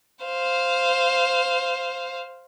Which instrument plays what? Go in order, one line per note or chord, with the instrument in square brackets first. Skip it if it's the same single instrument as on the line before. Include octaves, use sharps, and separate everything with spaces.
[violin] C5 F5